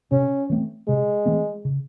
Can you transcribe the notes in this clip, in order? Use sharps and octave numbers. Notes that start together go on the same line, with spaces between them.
C3 C#4
E3 A3 C4
C3 G#3
E3 A3 C4
C#3